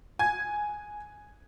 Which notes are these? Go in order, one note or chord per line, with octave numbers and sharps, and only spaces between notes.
G#5 G#6